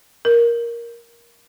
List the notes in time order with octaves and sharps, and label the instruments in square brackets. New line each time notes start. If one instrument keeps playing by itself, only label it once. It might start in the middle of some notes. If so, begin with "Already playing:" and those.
[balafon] A#4